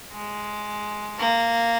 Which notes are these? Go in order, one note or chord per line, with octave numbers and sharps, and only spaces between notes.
G#3
A#3